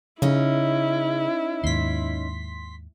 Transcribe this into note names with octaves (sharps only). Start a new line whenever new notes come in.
C#3 C#4 D#4 E4
D#2 G#2 C6 B6